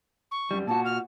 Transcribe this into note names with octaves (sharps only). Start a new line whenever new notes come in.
C#6
F#2 G3
A#2 F#4 A5
F6